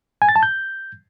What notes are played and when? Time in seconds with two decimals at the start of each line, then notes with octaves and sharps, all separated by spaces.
0.22 G#5
0.29 A6
0.36 A5
0.43 G6